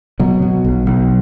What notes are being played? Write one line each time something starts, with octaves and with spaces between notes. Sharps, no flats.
B2 F#3
B2
B1
B1